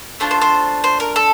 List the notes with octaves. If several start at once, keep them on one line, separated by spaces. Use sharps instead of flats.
A3 D4 F4 C5
C5
C5
C5
A#4
A4